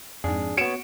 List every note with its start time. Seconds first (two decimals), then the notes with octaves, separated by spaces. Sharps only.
0.24 F2 G#2 D4 G#4
0.57 B3 F#4 C#5 C#7 D7 E7